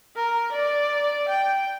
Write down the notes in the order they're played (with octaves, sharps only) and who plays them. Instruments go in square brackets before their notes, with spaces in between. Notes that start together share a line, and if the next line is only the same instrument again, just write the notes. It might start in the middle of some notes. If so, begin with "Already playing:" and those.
[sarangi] A#4
D5
G5